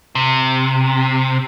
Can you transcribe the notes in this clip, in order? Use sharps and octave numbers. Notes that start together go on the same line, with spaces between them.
C3